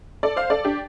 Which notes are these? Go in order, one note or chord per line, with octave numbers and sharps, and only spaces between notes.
A4 D5
C5 F5
A4 D5
D4 G4